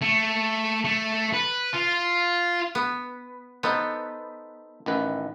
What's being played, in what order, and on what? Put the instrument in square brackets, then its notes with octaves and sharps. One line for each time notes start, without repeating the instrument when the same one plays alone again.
[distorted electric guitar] A3
A3
B4
F4
[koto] B3
[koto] B3 [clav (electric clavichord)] D#4 A4 C5
[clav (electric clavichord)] A1 D#3 B4